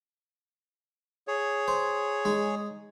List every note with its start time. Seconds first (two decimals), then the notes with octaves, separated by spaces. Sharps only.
1.28 G#4 C#5
1.68 C5
2.25 G#3 D#4